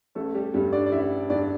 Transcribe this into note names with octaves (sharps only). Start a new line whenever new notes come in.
A1 A3 A4
G3 G4
G2 D3 G3 G4
D4 D5
D5
A1 E4 E5
G2 D3 D4 D5